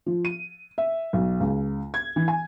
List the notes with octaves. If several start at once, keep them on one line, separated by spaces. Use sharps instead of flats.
F3
D#7
E5
B1
C#2
G#6
E3
G#5